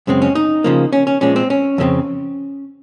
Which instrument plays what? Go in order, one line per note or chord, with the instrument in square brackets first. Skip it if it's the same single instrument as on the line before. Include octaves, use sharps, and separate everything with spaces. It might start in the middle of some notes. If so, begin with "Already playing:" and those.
[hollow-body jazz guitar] F#2 C#3 G#3 C4
C#4
D#4
C#3 F3 A#3
C#4
C#4
A#2 F3 G#3 C#4
C4
C#4
F2 C#3 G#3 C4